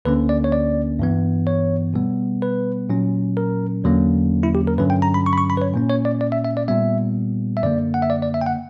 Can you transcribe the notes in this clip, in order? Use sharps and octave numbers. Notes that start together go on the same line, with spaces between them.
D2 D3 A#3 C#4 B4
D5
C#5
D5
G2 E3 B3
C#5
B2 G3 B3
B4
A#2 F#3 C#4
A#4
E2 D3 F#3 A#3 C#4
E4
G4
A#4
G2 D3 F#3 C#4 B4
G5
A#5
B5
C#6
B5
C#6
B5
B4
C#5
A#2 A#3 C#4
C#5
D5
D5
E5
E5
D5
A#2 G3 B3 E5
E5
F#2 D3 A#3 D5
F#5
E5
D5
D5
E5
G5
F#5